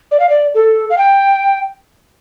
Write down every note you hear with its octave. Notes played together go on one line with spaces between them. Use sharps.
D5
F5
D5
A4
F5
G5